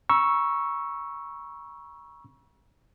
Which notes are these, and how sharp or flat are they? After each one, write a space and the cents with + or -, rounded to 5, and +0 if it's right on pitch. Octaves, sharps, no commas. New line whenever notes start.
A#5 +45 C#6 +0 E6 +5